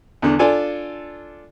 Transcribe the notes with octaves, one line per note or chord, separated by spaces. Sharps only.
E2 D3
D4 F4 A4 D5 G#5